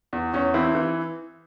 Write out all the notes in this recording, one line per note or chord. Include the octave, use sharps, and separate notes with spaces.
E2
E2 C#4
E3 C4 E4
E3